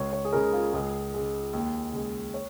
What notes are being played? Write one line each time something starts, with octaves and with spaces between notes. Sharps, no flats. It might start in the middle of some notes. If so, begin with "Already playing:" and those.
Already playing: C#2 C#5
C#5
G#4
C#3 G#3 A#4
F4
C#2 G#4
C#3 G#3
D#2
C#3 G#3
C#5